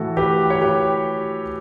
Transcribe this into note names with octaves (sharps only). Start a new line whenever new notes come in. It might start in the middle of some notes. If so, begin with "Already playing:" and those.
Already playing: A2 E3 F#4 A4
G4 B4
C#5
G4 B4